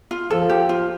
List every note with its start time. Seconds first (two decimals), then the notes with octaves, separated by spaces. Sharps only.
0.11 F4
0.30 F3 A4
0.49 G4
0.69 F4